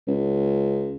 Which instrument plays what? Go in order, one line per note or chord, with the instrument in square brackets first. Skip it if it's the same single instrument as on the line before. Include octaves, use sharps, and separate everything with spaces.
[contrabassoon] C#2